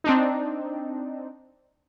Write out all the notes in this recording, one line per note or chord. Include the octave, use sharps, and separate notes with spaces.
C4 D4 D#4